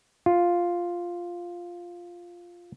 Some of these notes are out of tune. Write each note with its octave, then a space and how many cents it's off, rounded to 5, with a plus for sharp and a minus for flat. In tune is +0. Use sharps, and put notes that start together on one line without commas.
F4 +0